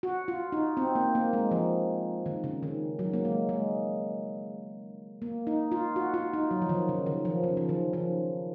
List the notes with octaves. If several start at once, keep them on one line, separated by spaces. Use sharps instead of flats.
F#4
F4
D#4
C4
A#3
A#3
G#3
F3
D#3
C#3
D#3
F#3
A#3
G#3
G#3
A#3
D#4
F4
F#4
F4
D#4
F#3
F3
D#3
C#3
D#3
F3
C#3
F3
D#3
F3